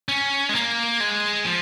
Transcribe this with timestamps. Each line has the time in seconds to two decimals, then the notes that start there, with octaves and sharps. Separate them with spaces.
0.09 C#4
0.49 G#3
0.55 A#3
1.00 G#3
1.45 F3